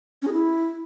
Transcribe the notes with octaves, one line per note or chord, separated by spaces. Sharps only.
C#4
G#4
E4